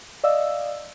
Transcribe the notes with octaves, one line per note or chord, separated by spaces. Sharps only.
D5 D#5 F5 E6